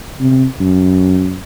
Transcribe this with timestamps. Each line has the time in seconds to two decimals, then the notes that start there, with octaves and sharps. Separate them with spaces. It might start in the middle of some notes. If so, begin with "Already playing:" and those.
0.20 C3
0.60 F#2